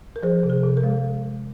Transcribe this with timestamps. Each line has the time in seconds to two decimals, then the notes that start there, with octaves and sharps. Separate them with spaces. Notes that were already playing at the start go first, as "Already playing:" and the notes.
0.16 A#4
0.23 F3 G#4 C5
0.43 C3
0.50 G#4
0.64 C3
0.77 A#4
0.83 G#3